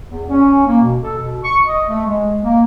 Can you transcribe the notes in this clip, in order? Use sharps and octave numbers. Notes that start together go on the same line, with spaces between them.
E2
C#4
A#3
B2
A4
B2
C#6
D#5
A3
G#3
A#3